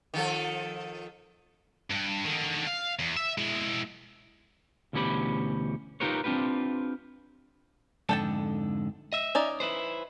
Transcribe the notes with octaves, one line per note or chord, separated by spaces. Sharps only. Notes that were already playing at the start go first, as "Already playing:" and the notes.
D#3 F3 A4
G2
D3 D#3
F5
E2
E5
G#3 E4
D2 B2 E3 C#4 G4 B5
D#4 F4 G4 A#4 B4 C#5
C4 D4 F4 G4 B4
F2 G#2 D3 A4 G5 A5
D#5 E5
C#4 D#4 D5
E4 B4 C5